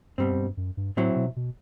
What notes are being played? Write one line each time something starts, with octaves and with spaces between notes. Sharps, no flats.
G2 B2 G3 C4
F#2
G2
F#2
G2
A2 F#3 C4 E4
B2
B2